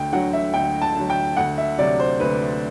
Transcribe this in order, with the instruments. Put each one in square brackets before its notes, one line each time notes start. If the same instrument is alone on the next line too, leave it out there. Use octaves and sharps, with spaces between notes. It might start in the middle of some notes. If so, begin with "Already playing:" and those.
Already playing: [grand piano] D2 G5
D3 F#3 F#5
E5
D2 G5
A5
D3 F#3
G5
D2 F#5
E5
C3 F#3 D5
C5
D2 B4